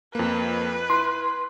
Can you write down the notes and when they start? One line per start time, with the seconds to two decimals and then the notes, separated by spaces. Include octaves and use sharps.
0.15 F2 A#3 B4
0.90 E4 C6